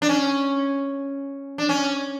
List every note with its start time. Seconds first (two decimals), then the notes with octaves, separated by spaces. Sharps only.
0.02 D4
0.09 C#4
1.58 D4
1.69 C#4